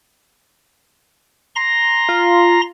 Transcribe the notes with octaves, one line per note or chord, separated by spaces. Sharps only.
A#5 C6 A#6
F4